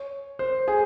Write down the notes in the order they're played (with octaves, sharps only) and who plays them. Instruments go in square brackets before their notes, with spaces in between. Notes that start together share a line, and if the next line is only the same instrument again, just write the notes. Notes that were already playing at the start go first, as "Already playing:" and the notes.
Already playing: [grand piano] C#5
C5
G#4